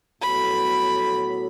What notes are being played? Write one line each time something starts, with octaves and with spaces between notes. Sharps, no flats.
A2 F#3 B3 F#4 A4 B5